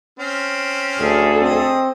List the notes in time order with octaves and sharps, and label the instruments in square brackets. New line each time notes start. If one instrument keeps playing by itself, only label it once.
[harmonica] C4 C#4 F6
[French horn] D2 [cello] G#4 A4
[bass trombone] C4 [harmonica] D#5